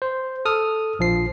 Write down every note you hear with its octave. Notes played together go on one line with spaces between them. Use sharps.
C5
A4 D#6 F6
A#1 F3 C7